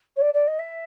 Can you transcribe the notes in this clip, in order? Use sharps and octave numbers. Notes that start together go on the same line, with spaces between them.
C#5
D5
D5
D#5
E5